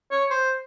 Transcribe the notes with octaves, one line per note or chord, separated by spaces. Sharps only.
C#5
C5